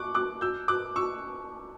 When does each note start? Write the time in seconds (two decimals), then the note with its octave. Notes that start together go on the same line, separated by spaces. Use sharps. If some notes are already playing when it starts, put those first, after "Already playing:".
Already playing: C#6 D6 F#6
0.15 D6 F#6
0.41 E6 G6
0.68 D6 F#6
0.96 C#6 E6